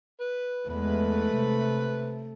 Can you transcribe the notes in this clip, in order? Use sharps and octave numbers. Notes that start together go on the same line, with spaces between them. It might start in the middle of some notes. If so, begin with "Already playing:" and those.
B4
E2 G#3 A3 B4 B5
C3